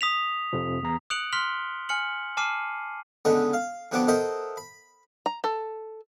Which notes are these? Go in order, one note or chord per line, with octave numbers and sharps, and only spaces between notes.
D#6 B6 F7
F2 C3 F3
E2 A#5
D#6 F#6 C#7 D7 F7 F#7
C6 F6 B6 F7 G7
G#5 F6 C#7 F#7
G#5 A5 D6 F6 C7 D#7
C#2 D3 A3 B3 D#5
F5
F2 D3 B3 F#4 A4 D6
A4 A#4 C5 D#5 E5 F#5
B5
A#5
A4